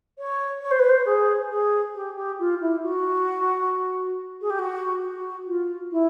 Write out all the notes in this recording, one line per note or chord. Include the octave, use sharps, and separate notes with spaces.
C#5
C#5
C5
B4
C5
G#4
G#4
G4
G4
F4
E4
F#4
G#4
G4
F#4
F#4
F4
E4